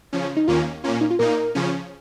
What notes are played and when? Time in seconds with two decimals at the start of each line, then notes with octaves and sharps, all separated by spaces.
0.13 C#3 F3 C#4
0.37 D#4
0.48 D#2 D#3 A#3 C#4 F4
0.84 A#2 A#3 C#4 F4
1.01 D#4
1.10 F4
1.19 A#2 A#3 D#4 A#4
1.55 C#3 F3 C#4